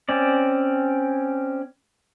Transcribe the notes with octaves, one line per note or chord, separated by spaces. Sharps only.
C4 C#4 D5